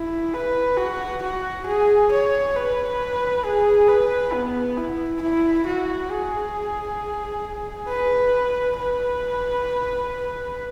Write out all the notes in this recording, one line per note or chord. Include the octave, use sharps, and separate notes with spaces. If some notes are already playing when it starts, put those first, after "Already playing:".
Already playing: E4
B4
F#4
F#4
G#4
C#5
B4
G#4
B4
B3
E4
E4
F#4
G#4
B4
B4